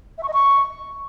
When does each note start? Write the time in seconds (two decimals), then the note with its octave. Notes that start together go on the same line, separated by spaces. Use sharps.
0.18 E5
0.23 C#6
0.28 D#5
0.33 C#6